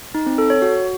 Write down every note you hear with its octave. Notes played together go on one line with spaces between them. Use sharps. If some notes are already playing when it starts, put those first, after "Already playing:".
D#4
C4
A4
C#5
F#4